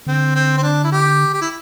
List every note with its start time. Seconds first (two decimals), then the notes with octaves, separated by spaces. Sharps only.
0.06 D3 C4
0.35 C4
0.58 C4
0.63 D4
0.84 E4
0.92 G4
1.33 G4
1.41 E4